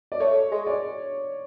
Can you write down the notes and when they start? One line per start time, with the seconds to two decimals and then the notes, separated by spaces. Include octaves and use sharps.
0.12 D5
0.20 A3 C#5
0.51 G#3
0.66 D5